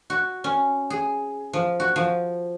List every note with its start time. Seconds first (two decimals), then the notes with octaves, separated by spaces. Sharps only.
0.10 F#4
0.44 C#4
0.90 G#4
1.53 F3
1.80 F#4
1.96 F3